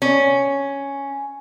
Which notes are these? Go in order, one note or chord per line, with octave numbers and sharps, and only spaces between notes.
C#4